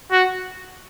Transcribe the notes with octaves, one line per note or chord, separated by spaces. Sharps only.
F#4